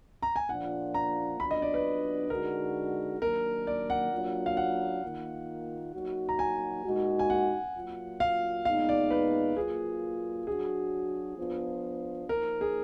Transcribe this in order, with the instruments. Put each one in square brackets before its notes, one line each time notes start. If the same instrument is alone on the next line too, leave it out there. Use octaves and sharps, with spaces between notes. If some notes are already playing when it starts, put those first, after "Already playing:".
[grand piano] A#5
G#5
[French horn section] A#2 F3 A#3 D4 F4 [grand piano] F#5
[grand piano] A#5
[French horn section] F#3 B3 D4 F4 [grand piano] B5
[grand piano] D#5
D5
B4
[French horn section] D3 G#3 D#4 F#4 [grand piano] A#4
[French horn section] D#3 F#3 A#3 D4 [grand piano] A#4
[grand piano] D5
F#5
[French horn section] F#3 A#3 D4 F4
[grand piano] F5
F#5
[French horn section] D#3 A#3 F4
F#3 A#3 D#4 F#4
[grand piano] A#5
G#5
[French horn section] A#2 G#3 D#4 F#4
[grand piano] G#5
F#5
[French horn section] F#3 A#3 F4
[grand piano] F5
[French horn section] A#2 G#3 B3 D#4 [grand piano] F5
[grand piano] D5
B4
[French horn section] F#3 A#3 F4 [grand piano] G#4
[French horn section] F#3 D4 F#4 [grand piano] G#4
[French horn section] F3 B3 D4 F4
[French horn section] F3 A#3 D#4 [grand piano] A#4
[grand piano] G#4